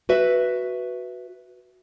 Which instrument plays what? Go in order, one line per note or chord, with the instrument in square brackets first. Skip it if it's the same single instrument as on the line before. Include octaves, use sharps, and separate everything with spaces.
[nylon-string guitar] F#4 B4 E5